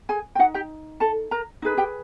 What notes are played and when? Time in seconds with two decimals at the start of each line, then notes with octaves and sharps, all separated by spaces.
0.09 G#4 G#5
0.35 G5
0.38 D#4 F#4 F#5
0.54 G4 G5
1.00 A4 A5
1.31 A#4 A#5
1.62 D#4 G#4 B4
1.77 G4 G5